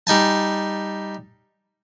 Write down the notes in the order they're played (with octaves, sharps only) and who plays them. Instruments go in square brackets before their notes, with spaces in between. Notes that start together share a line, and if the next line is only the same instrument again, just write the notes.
[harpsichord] G3 D#4 G#5 A5